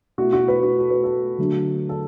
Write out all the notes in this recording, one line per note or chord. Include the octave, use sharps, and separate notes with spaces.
B2 A3 E4 F#4
F#4
B4
F#4
A4
B4
A4
D3 F#3 A3 D4
A4